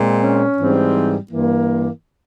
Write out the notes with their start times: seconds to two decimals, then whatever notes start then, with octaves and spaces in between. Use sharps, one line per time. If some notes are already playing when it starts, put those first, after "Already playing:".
Already playing: A#2 G#3 C4
0.23 C#4
0.58 G#2 E3 G3 C4
1.31 G2 E3 A#3